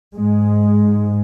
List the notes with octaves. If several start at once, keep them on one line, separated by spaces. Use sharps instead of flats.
G#2 G#3